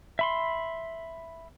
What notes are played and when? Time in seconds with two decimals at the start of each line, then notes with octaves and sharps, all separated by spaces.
0.19 E5 B5 C6